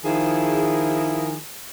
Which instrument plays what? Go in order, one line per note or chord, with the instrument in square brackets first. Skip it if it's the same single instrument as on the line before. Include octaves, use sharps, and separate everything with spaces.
[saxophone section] D#3 F3 E4 G#4